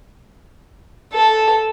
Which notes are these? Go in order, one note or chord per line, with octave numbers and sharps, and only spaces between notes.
A4